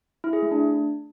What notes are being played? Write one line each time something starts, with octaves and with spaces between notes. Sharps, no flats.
E4
G#4
A3
D4